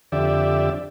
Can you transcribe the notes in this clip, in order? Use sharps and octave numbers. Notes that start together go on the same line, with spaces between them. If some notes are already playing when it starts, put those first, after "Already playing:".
F2 D3 G4 D5 E5